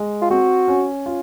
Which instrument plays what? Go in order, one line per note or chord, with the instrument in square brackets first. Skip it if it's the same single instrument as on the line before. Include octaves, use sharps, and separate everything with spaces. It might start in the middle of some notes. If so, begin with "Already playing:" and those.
Already playing: [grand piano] G#3
[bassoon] F4
[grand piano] C4 [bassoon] F#4
[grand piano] C#4
F4